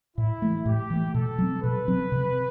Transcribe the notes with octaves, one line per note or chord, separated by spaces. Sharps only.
A2 E4
E3 A3
A2 G4
E3 A3
B2 A4
F#3 C4
B2 B4
F#3 C4
C3